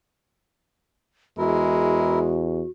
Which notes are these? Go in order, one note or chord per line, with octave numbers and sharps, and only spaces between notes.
E2 G#3 E4 F#4 A#4